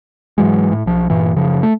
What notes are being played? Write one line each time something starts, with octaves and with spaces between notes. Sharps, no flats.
G#2 E3 F#3 G#3
A2
B1 F3
G2 A#2 E3
F#2 C#3 F3
A3